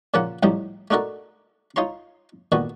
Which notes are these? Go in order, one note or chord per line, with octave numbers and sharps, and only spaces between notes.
A#2 C#3 F3 A#3 F4 F#5
C2 A2 F3 G3 D#4
A3 D4 D#4 F#4 A4 A#4
D#4 F4 C#5 A#5 C6
A#2 D3 D#3 B3 F#4